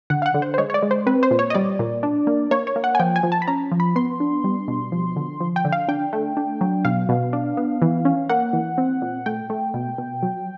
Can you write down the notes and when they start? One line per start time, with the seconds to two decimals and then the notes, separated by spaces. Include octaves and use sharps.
0.10 D3 F#5
0.22 F5
0.26 F#5
0.34 D3
0.42 C5
0.54 C5
0.58 G#3 C#5
0.70 C#5
0.74 D5
0.82 G#3
0.91 C5
1.06 C4 B4
1.23 C5
1.31 A#2
1.39 C#5
1.50 D#5
1.55 G3 D5
1.79 A#2
2.03 D4
2.27 A#3
2.51 A#3 C#5
2.67 C#5
2.76 A#3
2.84 F#5
2.95 G#5
2.99 F3 G5
3.16 G#5
3.23 F3
3.32 A5
3.42 B5
3.47 C#4 A#5
3.71 F3
3.80 B5
3.96 B3 C6
4.20 D4
4.44 G3
4.68 B2
4.92 F3
5.16 D3
5.40 F3
5.56 G5
5.65 D3
5.72 F5
5.88 D4 G5
6.13 A3
6.37 D4
6.61 F#3
6.85 B2 F5
7.09 B2
7.33 D4
7.57 B3
7.82 E3
8.05 C#4
8.29 A#3 F#5
8.53 E3
8.78 C4
9.02 A#2
9.26 A3 G5
9.50 A3
9.74 B2
9.98 B2
10.23 F#3